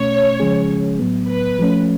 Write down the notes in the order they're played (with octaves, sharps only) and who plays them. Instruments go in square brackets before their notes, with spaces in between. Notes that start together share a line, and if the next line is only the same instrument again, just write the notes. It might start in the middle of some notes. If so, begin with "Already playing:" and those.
Already playing: [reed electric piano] B2 A3 C#4 [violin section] C#5
[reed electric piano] C#3 F3 G#3 C#4 G#4
A2 F#3 B3
[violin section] B4
[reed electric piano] F3 A3 C#4